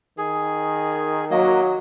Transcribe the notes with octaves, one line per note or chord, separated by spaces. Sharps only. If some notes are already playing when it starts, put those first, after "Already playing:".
D#3 G#4
F#3 A#3 D#5